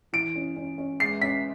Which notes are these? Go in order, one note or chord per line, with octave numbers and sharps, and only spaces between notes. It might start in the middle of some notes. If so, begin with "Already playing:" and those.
E3 D7
C#4
C#4
C#4
G#3 C7
C#4 B6